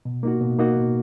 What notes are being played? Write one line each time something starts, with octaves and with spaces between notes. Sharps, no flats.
B2
A#3 D#4 F#4
B2
A#3 D#4 F#4
B2